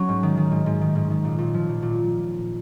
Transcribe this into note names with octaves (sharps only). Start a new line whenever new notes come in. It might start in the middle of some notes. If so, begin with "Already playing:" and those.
Already playing: F#3 C#4
G#2
D#3
D#3
G#2
G#2
D#3
G#2
D#3
A#2
A#2
F3
A#2
A#2